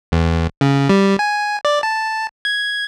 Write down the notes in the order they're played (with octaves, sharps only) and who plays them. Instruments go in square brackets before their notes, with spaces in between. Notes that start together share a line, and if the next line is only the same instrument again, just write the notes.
[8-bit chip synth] E2
C#3
G3
G#5
D5
A5
G#6